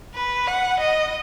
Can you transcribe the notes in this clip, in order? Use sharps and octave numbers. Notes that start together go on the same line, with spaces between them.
B4
F#5
D#5